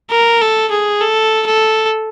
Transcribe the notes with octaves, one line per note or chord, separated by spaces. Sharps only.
A#4
A4
G#4
A4
A4